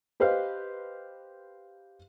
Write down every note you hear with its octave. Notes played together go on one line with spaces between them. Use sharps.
G4 B4 C5 D#5 F5